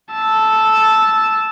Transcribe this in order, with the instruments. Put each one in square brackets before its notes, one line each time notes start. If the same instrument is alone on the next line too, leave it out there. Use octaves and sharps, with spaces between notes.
[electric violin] A5 E6